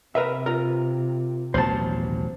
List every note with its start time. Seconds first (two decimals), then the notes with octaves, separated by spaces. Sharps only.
0.15 C3 A#4 B4 E5
0.46 F4 A#4
1.54 D#1 A1 F#3 B3 C5 A5
2.02 C3